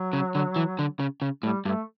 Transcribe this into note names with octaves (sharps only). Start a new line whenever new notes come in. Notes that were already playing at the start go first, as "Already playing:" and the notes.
Already playing: F#3
C#3
D3
E3
D3
C#3
C#3
A2 G3
G2 A3